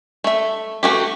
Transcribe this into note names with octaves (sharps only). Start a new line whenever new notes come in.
A3 E5
E3 A3 F#4 G4